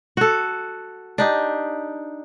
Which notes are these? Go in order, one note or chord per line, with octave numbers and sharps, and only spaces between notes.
F#4 A4
D4 D#4 G4